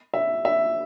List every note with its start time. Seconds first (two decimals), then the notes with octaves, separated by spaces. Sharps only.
0.14 E5
0.45 E5